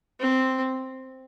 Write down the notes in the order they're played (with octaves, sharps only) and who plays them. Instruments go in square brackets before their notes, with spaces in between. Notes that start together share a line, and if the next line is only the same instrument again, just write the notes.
[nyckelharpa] C4